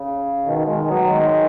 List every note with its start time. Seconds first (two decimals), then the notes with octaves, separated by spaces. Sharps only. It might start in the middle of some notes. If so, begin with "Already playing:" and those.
Already playing: C#3
0.46 B2 D#3
0.67 D#3 G#3
0.88 F#3 B3
1.09 D#3 G#3